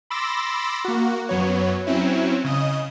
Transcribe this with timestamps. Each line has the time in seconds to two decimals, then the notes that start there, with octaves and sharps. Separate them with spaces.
0.10 B5 C6 D6 E6 A6 A#6
0.85 A#3 F#4
1.29 F#2 F#3 B3 C#5
1.87 F#3 C4 C#4 E4
2.44 C#3 D#5 D#6